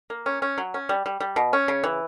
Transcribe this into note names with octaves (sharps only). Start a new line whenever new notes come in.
A#3
C#4
C#4
F#3
C#4
G3
G3
G3
B2
C#4
C#3
E3